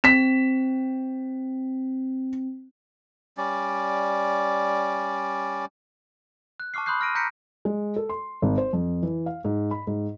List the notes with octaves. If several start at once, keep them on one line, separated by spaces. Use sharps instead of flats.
C4 B6 E7
G3 C#4 D5
F#6
A5 C#6 D6 F6 C7
B5 C6 D#6 F#6 G6 C7
F6 A#6 D7 D#7
A#5 G6 A#6 B6 C#7 D7
G#3
A4
C6
G#1
C5
F2
E3
F5
G#2
B5
G#2